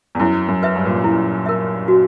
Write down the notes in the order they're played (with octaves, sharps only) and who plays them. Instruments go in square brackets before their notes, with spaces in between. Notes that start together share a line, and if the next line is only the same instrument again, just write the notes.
[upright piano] E2
[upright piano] F#2 [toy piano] E4
[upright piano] F#2
[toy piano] B4 E5
[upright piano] G2
A#2
G2
[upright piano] A#2 [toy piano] E4
[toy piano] A#4 E5
F#4